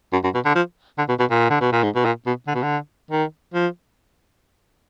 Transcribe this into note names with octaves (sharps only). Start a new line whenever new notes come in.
F#2
F#2
B2
D3
F3
D3
B2
B2
A#2
D3
B2
A#2
G#2
B2
A#2
B2
D3
B2
D3
D#3
F3